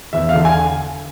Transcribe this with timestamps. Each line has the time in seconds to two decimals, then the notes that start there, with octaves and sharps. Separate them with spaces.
0.13 E2 E5
0.29 F5
0.34 D3
0.45 G#5